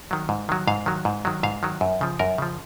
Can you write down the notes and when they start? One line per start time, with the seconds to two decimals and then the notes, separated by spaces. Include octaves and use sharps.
0.11 D#3 F#3
0.29 G#2
0.49 D#3 F#3
0.67 G#2 F5
0.86 D#3 F#3
1.05 G#2
1.25 D#3 F#3
1.43 G#2 F5
1.63 D#3 F#3
1.81 F#2
2.01 C#3 F3
2.19 F#2 A#4
2.38 C#3 F3